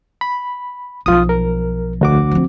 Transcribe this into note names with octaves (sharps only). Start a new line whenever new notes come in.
B5
B1 F3 F4 D#6
A#4
D2 F#4 D6
F3 C4